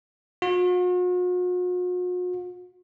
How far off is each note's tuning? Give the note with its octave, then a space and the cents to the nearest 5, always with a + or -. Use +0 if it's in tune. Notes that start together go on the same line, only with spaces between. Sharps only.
F#4 -45